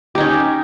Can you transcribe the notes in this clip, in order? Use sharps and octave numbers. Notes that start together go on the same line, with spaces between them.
C#4 D#4 G4